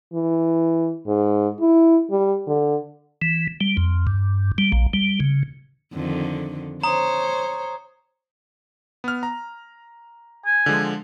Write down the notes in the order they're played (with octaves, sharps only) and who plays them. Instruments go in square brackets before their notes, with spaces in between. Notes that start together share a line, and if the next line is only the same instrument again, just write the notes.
[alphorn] E3
G#2
E4
G3
D3
[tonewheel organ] E3
G3
F2
G2
G3
A#1
G3
C#3
[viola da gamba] F2 D3 D#3
[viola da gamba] C5 C#5 [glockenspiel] A#5 D#6
[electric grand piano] B3 F6
A#5
[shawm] G#5
[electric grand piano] D3 F3 G#3